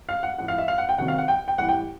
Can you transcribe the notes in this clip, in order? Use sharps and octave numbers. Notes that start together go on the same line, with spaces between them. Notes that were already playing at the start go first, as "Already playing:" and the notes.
F5
F#5
A2 F3 F#5
F5
E5
F5
F#5
G5
C3 D#3 F#3 F#5
F5
F#5
G5
G5
A2 E3 G3 F#5
G5